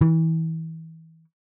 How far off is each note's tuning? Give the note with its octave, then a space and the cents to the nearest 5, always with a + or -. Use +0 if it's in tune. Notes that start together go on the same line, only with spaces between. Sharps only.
E3 -30